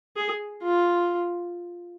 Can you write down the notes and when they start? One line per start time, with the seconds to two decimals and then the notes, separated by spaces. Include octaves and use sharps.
0.16 G#4
0.62 F4